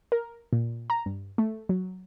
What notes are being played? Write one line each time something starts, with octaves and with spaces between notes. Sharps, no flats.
A#4
A#2
A#5
G2
A3
F#3